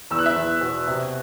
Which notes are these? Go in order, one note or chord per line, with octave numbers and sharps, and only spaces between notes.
E2 E6
F#6
E5 E6
E2
B2
C3